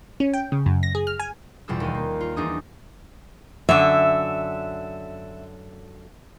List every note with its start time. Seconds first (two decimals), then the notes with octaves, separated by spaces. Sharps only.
0.20 C#4
0.33 G5
0.52 C#3
0.66 F#2
0.83 A#6
0.95 G#4
1.07 F6
1.19 G#5
1.68 E2 B2 G3 F4 G#4 E6
1.80 D#2 G5 D#7
1.95 A#3
2.21 F4
2.36 E2 D4 D#4 G#4 D#6 D#7
3.69 F#2 D3 E5